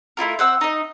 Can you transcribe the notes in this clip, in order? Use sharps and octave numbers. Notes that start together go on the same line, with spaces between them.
A3 E4 F4 A#4
C4 F#5 E6
D#4 D#5